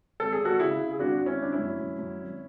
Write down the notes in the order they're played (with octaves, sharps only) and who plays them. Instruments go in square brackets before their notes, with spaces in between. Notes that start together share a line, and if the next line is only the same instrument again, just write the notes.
[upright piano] G#1 A4
G#4
G#1
F#4 A4
C#3 E4 G#4
C#3
G#4
G#1 D4 F#4
G#1
C#4 E4
G#1 D4
C#4 E4
F#2
F#2
F#2
G#1